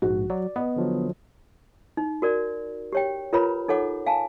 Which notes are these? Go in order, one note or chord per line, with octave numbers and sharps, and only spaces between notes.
A#1 G#2 F#4
F#3 D5
B3 D#5
D3 F3 F#3
D#4
F#4 A#4 D5
G4 C#5 G5
F4 A#4 B4 C#5 A#5 B5
D#4 A4 C#5 F#5 D6
F5 G#5 A5